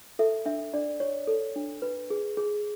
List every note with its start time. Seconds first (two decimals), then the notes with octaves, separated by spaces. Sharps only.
0.19 A4 E5
0.45 D4 E5
0.74 D4 D5
1.00 C#5
1.27 A4
1.56 D4
1.82 B4
2.10 G#4
2.37 G#4